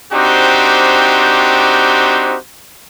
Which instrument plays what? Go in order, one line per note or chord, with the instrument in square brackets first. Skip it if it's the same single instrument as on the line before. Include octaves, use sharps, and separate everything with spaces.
[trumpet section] C4 D4 D#4 F#4 G4 C5